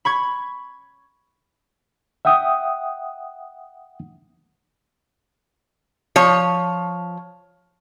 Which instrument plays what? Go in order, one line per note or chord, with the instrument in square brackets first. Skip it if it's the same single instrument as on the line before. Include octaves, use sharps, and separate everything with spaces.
[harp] B5 C#6 G#6
[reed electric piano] E5 F#5 G5 D#6
[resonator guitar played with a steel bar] F3 C#5